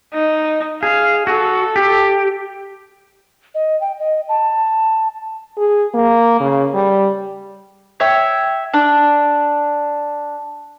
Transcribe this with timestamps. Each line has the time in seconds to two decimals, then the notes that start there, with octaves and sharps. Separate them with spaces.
0.14 D#4
0.83 G#4 F5
1.27 F#4 A4
1.76 G4
3.55 D#5
3.81 G5
3.99 D#5
4.29 A5
5.57 G#4
5.94 A#3
6.40 C#3
6.74 G3
8.00 C#5 E5 G5
8.74 D4